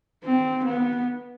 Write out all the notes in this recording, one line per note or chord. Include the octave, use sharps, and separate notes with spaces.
C4
B3